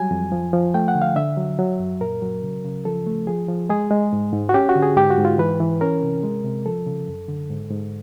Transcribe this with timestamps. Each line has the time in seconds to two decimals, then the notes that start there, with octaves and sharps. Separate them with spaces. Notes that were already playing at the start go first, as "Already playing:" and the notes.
Already playing: F#3 G3 G#5
0.11 F2
0.32 F3
0.53 F3
0.74 A3 G5
0.88 F#5
0.95 D3
1.02 F5
1.16 D3 E5
1.37 F#3
1.59 F#3
1.79 F#2
2.00 A#2 A#4
2.22 F#3
2.43 C#3
2.65 C#3
2.85 F3 A4
3.07 A3
3.27 F3 G#4
3.48 F3
3.69 G#3 G#4
3.91 G#3
4.13 G#2
4.33 G#2
4.49 F#4
4.54 C#4 G4
4.69 F#4
4.75 D3
4.83 G#4
4.96 G#2 G4
5.10 F#4
5.18 G#2
5.25 F4
5.38 E3 B4
5.60 E3
5.81 C#4 A#4
6.02 C3
6.23 G#3
6.45 C3
6.66 F3 A4
6.86 C#3
7.08 F#2
7.28 D3
7.50 G#2
7.71 G#2